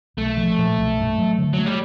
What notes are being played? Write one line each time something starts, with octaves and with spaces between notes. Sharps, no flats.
B1 A3
F3
A#2
B1
G2
F#3
D3
F#3
A3
G3